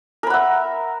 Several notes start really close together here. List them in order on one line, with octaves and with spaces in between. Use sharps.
A#4 B5 F#5 E5